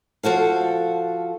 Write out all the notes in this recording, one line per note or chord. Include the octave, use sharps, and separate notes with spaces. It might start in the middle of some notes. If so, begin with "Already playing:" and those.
F3 F#4 A4 F5